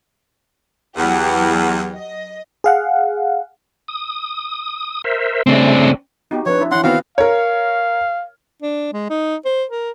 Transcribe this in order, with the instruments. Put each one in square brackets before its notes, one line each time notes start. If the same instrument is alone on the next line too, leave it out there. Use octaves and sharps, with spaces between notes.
[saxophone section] E2 [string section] F#3 G4 F#5
[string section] D#5
[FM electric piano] G#4 F5 F#5
[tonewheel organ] D#6
A#4 C5 E5
[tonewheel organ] C#3 A3 [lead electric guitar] C4 D4
[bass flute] B3 [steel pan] D#4 F#4 G4
[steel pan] F3 C4 D4 [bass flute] B4 [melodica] C#5
[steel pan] D4 E4
[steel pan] E3 C#4 [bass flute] E4 [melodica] F#5 C6
[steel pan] D#3 [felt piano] B3 C4 F#4 [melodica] F5
[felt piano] A#4 C#5 [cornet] F5
[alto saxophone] D4
G#3
D#4
C5
A#4